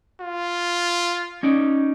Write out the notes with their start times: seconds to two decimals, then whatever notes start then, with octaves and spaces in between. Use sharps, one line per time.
0.21 F4
1.43 C#4 D#4 D5